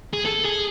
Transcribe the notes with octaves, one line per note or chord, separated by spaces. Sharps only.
G#4
A4
G#4